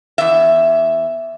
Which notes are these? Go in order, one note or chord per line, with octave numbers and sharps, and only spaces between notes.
E2 E5